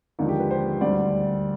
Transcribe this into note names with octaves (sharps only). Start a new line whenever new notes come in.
D#2 D3 F3 G#3 D#4
G4
B4
C5
D2 D3 G3 D5